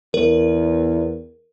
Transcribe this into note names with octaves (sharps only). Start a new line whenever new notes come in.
E2 A#4